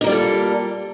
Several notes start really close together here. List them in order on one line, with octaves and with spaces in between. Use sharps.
D#4 A#3 G3 F4 A4